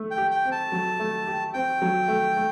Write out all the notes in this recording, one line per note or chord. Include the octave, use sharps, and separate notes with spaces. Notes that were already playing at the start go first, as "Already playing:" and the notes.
Already playing: A3
G5
G4
G5
C4
A5
F#3
A3
G4
C4 G5
F#3
A3
A3